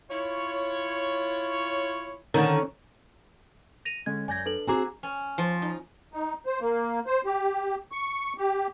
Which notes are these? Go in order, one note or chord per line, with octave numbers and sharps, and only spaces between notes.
E4 F4 C#5
D3 D#3 C#4
A#6 D#7 F7
D3 G#3 C#4 G#6
F#2 D5 G#5 G6 G#6 A#6
D4 A4 B4 F#7
C4 F#4 G#4 G#5 A#5 D6
C#4
F3
D#4
D#4
C5
A#3
C5
G4
C#6
G4